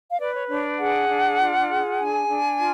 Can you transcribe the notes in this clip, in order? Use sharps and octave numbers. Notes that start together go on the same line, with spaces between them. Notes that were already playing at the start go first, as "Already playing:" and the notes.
F5
B4 D5
C#5
D4 C#5
G#4 F#5
D4
F4
G#4
D4 G#5
D4
F4